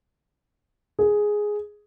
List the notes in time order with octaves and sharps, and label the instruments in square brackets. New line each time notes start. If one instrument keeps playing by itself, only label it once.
[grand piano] G#4